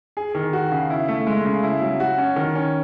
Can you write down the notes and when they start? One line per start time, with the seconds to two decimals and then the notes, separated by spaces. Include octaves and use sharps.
0.17 G#4
0.35 D#3
0.53 F#4
0.72 C#3
0.90 E4
1.08 A3
1.27 G#3
1.45 C#3
1.63 E4
1.81 F#3
2.00 F#4
2.18 C#4
2.36 D#3
2.55 C#4